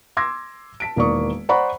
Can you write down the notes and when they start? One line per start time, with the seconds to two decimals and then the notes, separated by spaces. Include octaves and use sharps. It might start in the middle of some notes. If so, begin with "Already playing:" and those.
0.17 C6 D6 E6 G#6 A#6
0.80 A5 B6 D7
0.96 E1 D#3 A#3 D5 C#6 D#6
1.49 C5 D5 F#5 A#5 B5 C#6